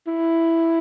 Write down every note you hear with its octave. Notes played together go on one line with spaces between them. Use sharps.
E4